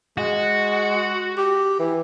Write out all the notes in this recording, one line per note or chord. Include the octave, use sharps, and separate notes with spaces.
G#3 F#4
G4
E3